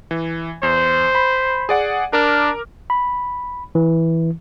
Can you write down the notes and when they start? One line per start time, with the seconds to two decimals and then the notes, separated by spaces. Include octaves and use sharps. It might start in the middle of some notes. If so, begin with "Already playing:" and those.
0.11 E3
0.63 E2 C5
1.15 B5
1.69 G#4 D5 F#5
2.13 D4 A#4 D6 F6
2.90 B5
3.75 E3